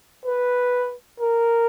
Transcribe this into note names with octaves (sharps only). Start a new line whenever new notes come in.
B4
A#4